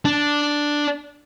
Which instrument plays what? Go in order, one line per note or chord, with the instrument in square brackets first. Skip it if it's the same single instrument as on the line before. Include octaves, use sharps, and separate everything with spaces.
[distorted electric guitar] D4